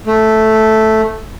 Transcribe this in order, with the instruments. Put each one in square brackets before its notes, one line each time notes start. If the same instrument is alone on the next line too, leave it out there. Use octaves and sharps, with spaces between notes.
[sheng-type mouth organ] A3